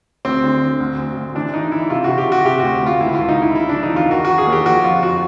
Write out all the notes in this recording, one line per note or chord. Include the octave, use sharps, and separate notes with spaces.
D2 C4
D3
D3
D2
D2
D2
E3 D4
E3 D#4
E3 E4
C3 F4
C3 F#4
G4
C3 F#4
C3 G4
D2 F#4
D2 F4
C#2 E4
C#2 F4
D#4
C#3 E4
C#3 E4
D4
F3
D#4
E2 F4
D#3 F#4
D#3 F#4
G#4
D#2
G4
F3 F#4
F2 F4
F3 F#4